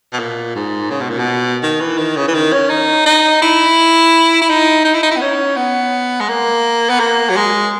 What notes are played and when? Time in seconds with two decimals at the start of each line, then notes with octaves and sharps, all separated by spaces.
0.13 B2
0.19 A#2
0.55 G#2
0.90 C#3
1.01 B2
1.10 A#2
1.19 B2
1.63 D#3
1.80 E3
1.98 D#3
2.17 C#3
2.28 E3
2.35 D#3
2.52 C#4
2.69 D#4
3.06 D#4
3.42 E4
4.41 E4
4.49 D#4
4.85 D#4
4.94 E4
5.03 D#4
5.12 E4
5.17 B3
5.21 C#4
5.56 B3
6.21 G#3
6.29 A#3
6.90 B3
7.00 A#3
7.29 F#3
7.37 G#3